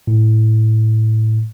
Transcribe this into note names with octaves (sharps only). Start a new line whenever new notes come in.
A2